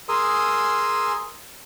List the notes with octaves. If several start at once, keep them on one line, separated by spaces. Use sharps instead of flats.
G#4 A#4 G#5 C6 D#6 E6